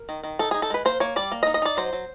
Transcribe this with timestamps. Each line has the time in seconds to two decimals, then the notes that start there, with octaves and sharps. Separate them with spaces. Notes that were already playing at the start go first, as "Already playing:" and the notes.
Already playing: A#4
0.09 D#3
0.24 D#3
0.39 D#4 A4
0.51 D#4 G#4
0.62 A4
0.70 G#3 B4
0.85 A#3 C5
1.00 A#3 C#5
1.16 G3 D5
1.32 A#3
1.43 D#5
1.47 D#4
1.54 D#5
1.62 D#4 D5
1.77 F#3 C5
1.93 F#3